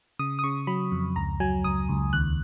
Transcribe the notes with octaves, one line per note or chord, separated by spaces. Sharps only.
C#3 D#6
D#6
C#3 C#6
F#3 B5
F2
C#2 A#5
F#3 G#5
C#2 D#6
C#2
D#2 F#6